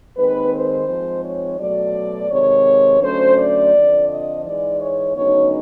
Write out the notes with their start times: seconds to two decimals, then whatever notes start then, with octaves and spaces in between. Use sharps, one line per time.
0.16 D#2 D#3 G#3 C4 B4
0.52 C5
0.87 G#2 F3 G#3 C4
1.23 C#5
1.58 B2 F#3 A3 D5
2.30 C3 D#3 G#3 C#5
3.01 D3 F#3 A3 C#4 C5
3.37 D5
3.73 F2 D3 F3
4.08 D#5
4.44 G#2 E3 G#3 D5
4.80 C#5
5.15 D2 C#3 F#3 B3 D#4 C#5